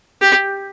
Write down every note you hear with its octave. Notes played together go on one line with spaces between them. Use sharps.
G4